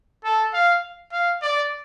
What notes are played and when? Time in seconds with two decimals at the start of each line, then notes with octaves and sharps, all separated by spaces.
0.24 A4
0.54 F5
1.12 F5
1.42 D5